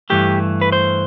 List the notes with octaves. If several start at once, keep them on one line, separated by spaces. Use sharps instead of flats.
G2 E3 A3 G4
B4
C5